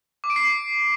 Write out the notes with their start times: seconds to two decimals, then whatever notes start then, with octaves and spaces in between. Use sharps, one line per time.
0.24 D6
0.30 D7
0.36 C7